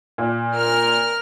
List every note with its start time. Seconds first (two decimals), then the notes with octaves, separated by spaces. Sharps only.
0.18 A#2
0.54 A#4 F6